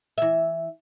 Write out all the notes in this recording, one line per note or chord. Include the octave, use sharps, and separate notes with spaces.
E3 E5